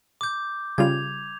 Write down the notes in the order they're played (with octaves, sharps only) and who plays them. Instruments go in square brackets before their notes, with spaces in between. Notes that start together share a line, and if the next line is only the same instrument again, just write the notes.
[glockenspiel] D6 G6
[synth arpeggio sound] C#3 G3 F4 [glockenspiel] G#6 F7